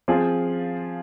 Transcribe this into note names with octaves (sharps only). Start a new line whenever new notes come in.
F3 C4 F4 G#4